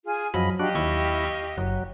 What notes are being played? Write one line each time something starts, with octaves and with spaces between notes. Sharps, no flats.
F4 G#4 G#5
F#2 F3 F#3 D#5 B5
D4 F#4 G4 D#5 F5
D#2 E4 C#6
F#1 F#3